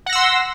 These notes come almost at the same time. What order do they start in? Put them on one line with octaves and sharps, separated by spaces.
F#5 A#6 E6 C6